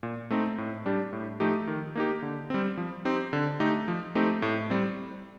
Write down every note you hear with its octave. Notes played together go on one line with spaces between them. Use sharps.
A#2
A3 C4 D#4
A2
G3 D4 G4
A2
F3 A3 D#4 G4
D#3
A#3 D#4 G4
D3
G3 C4
F3
C4 D#4 G4
D3
A3 D#4 G4
F3
A3 C4 D#4 G4
A2
G3 C4